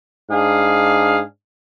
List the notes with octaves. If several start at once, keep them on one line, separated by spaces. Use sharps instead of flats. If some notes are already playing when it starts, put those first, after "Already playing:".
G#2 D4 G#4 F5